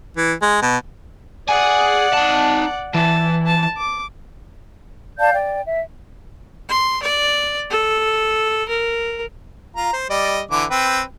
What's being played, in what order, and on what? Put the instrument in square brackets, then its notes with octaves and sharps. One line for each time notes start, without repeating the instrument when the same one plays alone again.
[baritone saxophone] E3
G#3
B2
[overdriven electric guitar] G#4 G#5 [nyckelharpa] D5 F#5
[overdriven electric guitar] D#4 A5
[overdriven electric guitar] E3 [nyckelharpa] A5
[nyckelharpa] A5
D6
[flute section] D5 F5 A5 G6
D5 G5
E5
[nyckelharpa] C6
D5
A4
A#4
[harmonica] F4 A#5
C5
G3 D5 D#5
D3 E3 D6
C4 B4 G5